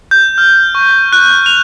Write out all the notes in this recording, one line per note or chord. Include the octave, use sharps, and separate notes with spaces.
G6
F6
C#6
F#6
F7